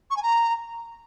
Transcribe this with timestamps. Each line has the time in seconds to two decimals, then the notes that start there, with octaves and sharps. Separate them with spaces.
0.10 C#6
0.16 G#5
0.23 A#5